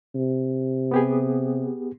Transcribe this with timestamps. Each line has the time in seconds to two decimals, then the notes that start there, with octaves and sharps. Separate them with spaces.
0.15 C3
0.91 B3 G4 G#4